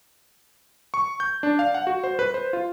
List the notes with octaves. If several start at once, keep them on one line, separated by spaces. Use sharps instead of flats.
C#6
G6
D4
F5
F#5
F#4
C5
B4
C5
F4